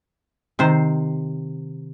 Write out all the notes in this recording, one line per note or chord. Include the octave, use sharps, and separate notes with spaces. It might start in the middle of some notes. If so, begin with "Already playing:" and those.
C3 D#3 C5